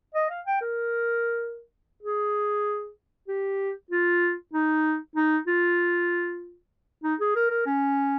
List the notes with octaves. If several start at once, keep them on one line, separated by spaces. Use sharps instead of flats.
D#5
F5
G5
A#4
G#4
G4
F4
D#4
D#4
F4
D#4
G#4
A#4
A#4
C#4